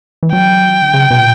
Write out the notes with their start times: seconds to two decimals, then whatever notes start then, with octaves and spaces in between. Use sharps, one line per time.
0.23 E3
0.33 F#3 G5
0.82 D3
0.94 C#3
1.11 B2
1.19 A#2